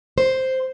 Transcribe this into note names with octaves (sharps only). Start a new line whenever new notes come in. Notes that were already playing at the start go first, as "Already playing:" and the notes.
C5